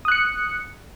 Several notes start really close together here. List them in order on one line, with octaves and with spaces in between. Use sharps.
D#6 F#6 C#7